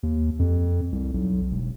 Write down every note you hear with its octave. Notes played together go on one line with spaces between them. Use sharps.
D#2
F2
C2
B1
E1